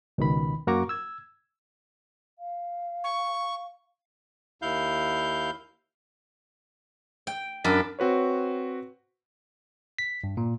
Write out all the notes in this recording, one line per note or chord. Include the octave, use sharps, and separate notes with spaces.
C#2 B2 D#3 B5
F#2 A#3 F#4 A#5 C#6 D6
E6 G#6
F5
C#6
D#2 E4 F5 G6
G5
F#2 D4 A5 B5
C4 F#4 B4 C#5
B6
G2
A#2